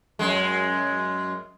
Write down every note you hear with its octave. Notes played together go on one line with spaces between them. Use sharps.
F#2 G#3